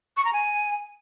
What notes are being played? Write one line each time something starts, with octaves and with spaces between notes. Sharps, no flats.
C#6
A#5
G#5